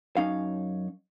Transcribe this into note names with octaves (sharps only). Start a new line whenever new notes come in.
F#2 C#4 D#4 F5